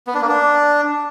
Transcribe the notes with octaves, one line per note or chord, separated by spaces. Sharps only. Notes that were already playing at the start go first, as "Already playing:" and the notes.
B3
D4
A#3
D4